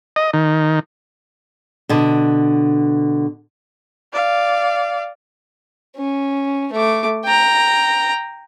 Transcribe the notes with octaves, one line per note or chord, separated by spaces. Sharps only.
D#5
D#3
B2 D3
D5 F5
C#4
A3 D6
G5 A#5